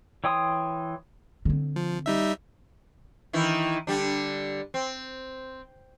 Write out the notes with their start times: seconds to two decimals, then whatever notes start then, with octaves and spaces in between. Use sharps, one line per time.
0.24 E3 C#5 G5 C6 D#6
1.45 D3 C4
1.76 F3
2.06 G3 D#4 E5
3.33 D#3 E3 E4
3.87 D3 G3 D4
4.74 C4